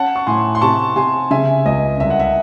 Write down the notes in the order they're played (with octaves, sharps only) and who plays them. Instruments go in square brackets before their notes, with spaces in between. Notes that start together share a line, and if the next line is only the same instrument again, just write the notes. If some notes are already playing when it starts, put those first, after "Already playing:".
Already playing: [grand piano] C#4 [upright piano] F#5 A5
[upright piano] C#6
[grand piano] A2 [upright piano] G#5 C6
[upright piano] C6
[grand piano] C3 [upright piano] A5 C#6
[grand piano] C3 [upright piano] G#5 C6
[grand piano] C#3 [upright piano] E5 G#5
[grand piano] C#2 [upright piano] D#5
[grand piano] C2 [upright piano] E5
[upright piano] F#5
E5